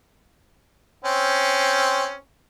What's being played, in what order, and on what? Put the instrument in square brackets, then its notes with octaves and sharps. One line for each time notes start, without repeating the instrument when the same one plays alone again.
[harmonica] C4 C#4